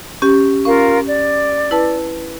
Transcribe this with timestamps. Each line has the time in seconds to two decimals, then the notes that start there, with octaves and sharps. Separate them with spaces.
0.22 C#4 G4
0.65 C#4 F4 A#4 F5
1.08 D5
1.71 E4 B4 A5